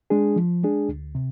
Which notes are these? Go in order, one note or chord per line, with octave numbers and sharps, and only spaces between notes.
G#3 D4 G#4
F3
G#3 D4 G#4
D2
C3